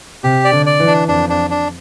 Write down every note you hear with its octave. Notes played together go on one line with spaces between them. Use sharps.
C3 G4
D5
D3
D5
E3
D4
F2 D4
D4
D4